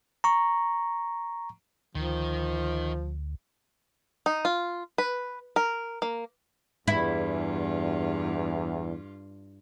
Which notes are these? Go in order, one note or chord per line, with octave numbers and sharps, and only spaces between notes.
A#5 C#6
D2 D#3 F3
D#4
F4
B4
A#4
A#3
E2 G2 E4 F4